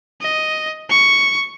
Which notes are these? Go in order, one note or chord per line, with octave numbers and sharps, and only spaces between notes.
D#5
C#6